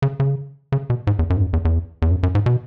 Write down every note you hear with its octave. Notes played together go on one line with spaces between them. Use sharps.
C#3
C#3
C#3
B2
G#2
E2
F#2
G#2
F#2
E2
E2
E2
F#2
F#2
G#2
B2